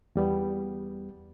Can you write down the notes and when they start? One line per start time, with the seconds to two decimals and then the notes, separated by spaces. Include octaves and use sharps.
0.16 E2 G3 B3